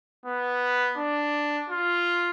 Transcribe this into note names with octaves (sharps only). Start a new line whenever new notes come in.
B3
D4
F4